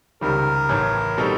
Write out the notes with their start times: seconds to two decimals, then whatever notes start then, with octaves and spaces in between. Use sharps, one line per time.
0.21 C#2 C3 D#3 G3 A#4
0.69 A1 A2 E3
1.17 B2 G3 C4 D#4 A4